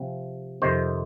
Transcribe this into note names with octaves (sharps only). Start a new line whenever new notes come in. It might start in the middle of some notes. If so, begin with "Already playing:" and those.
Already playing: C3 F3 C4
F2 C3 D#3 C5